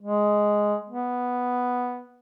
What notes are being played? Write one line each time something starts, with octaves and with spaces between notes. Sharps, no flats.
G#3
B3